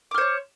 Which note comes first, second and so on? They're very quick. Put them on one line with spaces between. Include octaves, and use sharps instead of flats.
D6 F6 C5 C#5